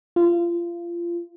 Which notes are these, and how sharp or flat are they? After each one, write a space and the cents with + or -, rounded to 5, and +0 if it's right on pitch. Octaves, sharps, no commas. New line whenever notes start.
F4 -25